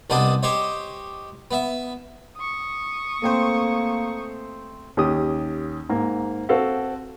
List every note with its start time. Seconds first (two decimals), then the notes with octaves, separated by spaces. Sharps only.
0.10 C2 B3 D4 C5 D#5 D#6
0.43 G4 C5 C#5 D#5
1.51 B3 E5
2.37 C#6 D#6
3.22 A3 A#3 C4 C5
4.97 D#2 C#4 G4 D#6
5.89 G#2 A#3
6.49 C4 F#4 A4 F5